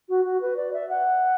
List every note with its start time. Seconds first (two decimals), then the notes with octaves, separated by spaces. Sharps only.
0.09 F#4
0.25 F#4
0.41 B4
0.56 D5
0.73 E5
0.89 F#5